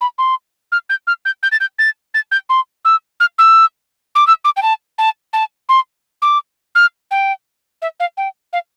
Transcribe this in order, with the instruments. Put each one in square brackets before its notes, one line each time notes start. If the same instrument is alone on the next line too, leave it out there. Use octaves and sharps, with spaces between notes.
[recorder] B5
C6
F6
G6
F6
G6
G6
A6
G6
A6
A6
G6
C6
E6
F6
E6
D6
E6
D6
G5
A5
A5
A5
C6
D6
F6
G5
E5
F5
G5
F5